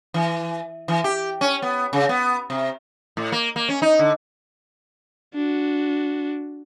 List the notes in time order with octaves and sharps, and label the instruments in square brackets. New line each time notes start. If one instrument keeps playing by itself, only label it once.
[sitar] E3
E3
G4
C#4
B3
C#3
B3
C3
A2
A#3
A#3
C#4
D#4
D3
[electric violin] D4 F#4